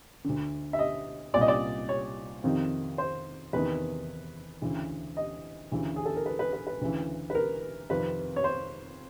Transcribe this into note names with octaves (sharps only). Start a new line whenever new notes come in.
D2 D3
E5
D#5
C2 A#2 D5
D#5
D5
C#5
F2 C3 D#3
C5
E2 C3 D#3 B4
D2 C#3 E3
D#5
D2 C#3 E3
G#4
A4
A#4
B4
B4
B4
B4
D2 C#3 E3
B4
A#4
F2 C3 D#3 B4
C#5
C5